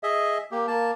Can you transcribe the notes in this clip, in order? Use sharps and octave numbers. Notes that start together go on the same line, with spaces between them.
G#4 D#5 E5
A#3 G4
A#3 A5